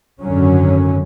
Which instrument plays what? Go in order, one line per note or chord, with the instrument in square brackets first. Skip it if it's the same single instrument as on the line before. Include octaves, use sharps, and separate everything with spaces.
[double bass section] G#1 F#2 D3 F#3 C#4